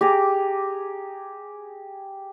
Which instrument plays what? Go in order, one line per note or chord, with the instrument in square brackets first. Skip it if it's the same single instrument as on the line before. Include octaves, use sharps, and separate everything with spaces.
[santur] G4 G#4 A#5 D6